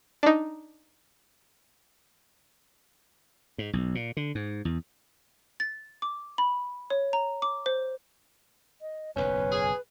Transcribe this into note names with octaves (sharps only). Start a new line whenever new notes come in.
D4 D#4
G#2
B1
A#2
D3
G#2
E2
A6
D6
B5
C#5
A#5
D6
C5
D#5
F#1 B1 E2 C#4 B4
G#4